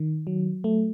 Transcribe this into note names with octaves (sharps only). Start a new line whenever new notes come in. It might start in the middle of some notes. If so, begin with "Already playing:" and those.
Already playing: D#3
F#3
A3